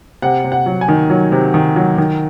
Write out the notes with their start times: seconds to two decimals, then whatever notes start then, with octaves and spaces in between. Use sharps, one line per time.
0.22 C3 F#5
0.44 C3
0.52 F#5
0.66 F#3
0.81 G#5
0.88 D#3
1.10 F#3
1.32 C3
1.54 D#3
1.76 F#3
1.98 D#3